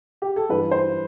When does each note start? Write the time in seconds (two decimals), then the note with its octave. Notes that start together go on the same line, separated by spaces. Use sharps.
0.22 G4
0.36 A4
0.49 G2 E3 B4
0.71 C5